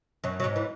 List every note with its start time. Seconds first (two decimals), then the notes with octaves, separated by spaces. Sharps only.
0.24 F#2 F#3
0.40 F#3
0.44 G#2 G#3
0.56 E3